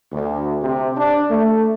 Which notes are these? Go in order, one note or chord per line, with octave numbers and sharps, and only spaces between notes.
D2
C3
D4
A3